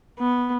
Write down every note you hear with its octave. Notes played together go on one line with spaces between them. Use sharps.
B3